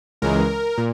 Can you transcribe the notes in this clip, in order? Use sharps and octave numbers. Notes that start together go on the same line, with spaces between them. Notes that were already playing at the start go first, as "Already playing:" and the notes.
C#2 C#3 E3 G#3 A#4
A#2